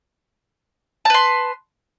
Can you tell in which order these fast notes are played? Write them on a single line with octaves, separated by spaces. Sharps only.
A5 B4 C6